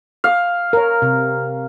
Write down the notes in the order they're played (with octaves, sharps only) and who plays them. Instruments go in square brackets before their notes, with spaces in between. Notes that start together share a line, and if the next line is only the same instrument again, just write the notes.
[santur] F5
[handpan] A#4 C#5
C3